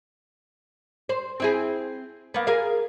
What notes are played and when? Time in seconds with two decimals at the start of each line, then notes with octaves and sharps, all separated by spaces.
1.09 C5
1.40 C4 E4 G#4
2.34 A#3 B3
2.47 G#4 A#4 F5